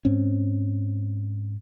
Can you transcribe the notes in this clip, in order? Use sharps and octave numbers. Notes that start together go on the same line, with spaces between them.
G#2 C4 C#4